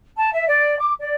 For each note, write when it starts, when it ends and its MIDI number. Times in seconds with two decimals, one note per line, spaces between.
0.17 0.31 81
0.32 0.47 76
0.48 0.77 74
0.78 0.93 86
0.99 1.15 74